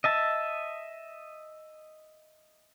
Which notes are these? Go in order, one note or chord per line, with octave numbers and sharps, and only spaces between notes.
D#5 E5 A5